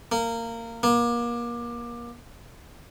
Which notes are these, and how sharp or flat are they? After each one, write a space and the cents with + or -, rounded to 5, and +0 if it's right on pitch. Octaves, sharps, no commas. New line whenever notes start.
A#3 -20
A#3 +30